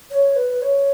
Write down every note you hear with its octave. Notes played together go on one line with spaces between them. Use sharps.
C#5
B4
C#5